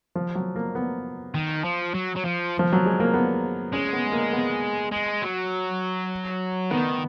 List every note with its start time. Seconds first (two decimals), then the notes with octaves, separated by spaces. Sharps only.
0.15 F3
0.35 F#3
0.56 A#3
0.75 B3
1.35 D#3
1.64 F3
1.94 F#3
2.16 F#3
2.24 F3
2.59 F3
2.73 F#3
2.86 G#3
3.00 A#3
3.14 B3
3.73 G#3 C#4
3.93 B3
4.12 A#3
4.33 B3
4.92 G#3
5.22 F#3
6.71 D#3 B3